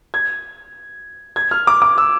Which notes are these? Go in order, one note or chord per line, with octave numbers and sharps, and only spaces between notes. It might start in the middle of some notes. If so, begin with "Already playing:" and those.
G#6
G#6
F6
D6
D6
E6